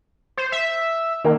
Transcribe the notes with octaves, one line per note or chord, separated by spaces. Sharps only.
C5
E5
D#3 A#3